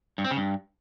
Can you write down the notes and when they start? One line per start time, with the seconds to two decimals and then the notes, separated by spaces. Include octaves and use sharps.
0.18 G2
0.24 C4
0.31 C#3
0.37 G2